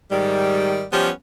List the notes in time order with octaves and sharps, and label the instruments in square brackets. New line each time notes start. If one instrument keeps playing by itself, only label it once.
[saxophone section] G#2 D#3 G3
F3 G3 B3 C#4 G4